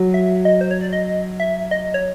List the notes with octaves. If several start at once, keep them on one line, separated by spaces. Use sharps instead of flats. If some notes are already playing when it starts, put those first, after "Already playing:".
Already playing: F#3
E5
D#5
C5
C#5
D5
D#5
E5
D#5
C#5